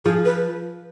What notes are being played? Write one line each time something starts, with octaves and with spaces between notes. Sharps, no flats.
F3 G#4
B4